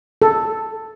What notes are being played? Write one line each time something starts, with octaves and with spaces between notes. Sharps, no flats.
A4